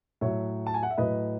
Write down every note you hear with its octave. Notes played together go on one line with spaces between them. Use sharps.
A2 F#3 C#5 E5
A5
G#5
F#5
E5
A2 F#3 B4 D#5